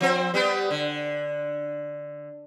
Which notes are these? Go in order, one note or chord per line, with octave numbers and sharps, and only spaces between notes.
F3 C4 C5
G3 B3 G4
D3